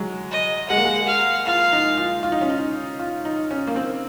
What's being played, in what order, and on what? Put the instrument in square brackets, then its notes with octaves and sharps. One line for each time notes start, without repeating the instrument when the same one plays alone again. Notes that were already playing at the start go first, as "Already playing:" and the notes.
Already playing: [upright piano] F#3 G#3
[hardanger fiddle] D#5
[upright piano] G#3 [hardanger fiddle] F#5
[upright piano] A#3
G#3
[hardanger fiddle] F5
[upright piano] F4 [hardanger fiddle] F5
[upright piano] D#4
F4
F4
D#4
C#4
D#4
F4
D#4
C#4
A#3
C4